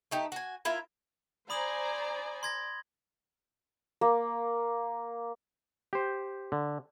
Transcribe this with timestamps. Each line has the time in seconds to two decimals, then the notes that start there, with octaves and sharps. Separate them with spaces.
0.11 A3 D#4 G4
0.32 F#4 G#5
0.65 E4 F4 A#4 E5
1.50 C5 D5 G#5 A#5 B5 D#6 F#7
2.43 C6 G#6 A#6
4.01 A#3
5.93 G4 C5
6.52 D3